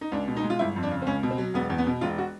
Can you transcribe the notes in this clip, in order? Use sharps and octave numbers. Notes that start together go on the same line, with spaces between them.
D#4
C#2 D4
B2
D#4
G#3
F4
G1 E4
F2
D4
C#3
C4
C#2 C#4
B2
C4
F#3
E1 B3
E2
B3
B2
E1 F4
F#4